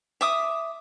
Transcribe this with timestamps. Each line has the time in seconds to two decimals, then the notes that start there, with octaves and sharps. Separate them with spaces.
0.21 E5 D6 D#6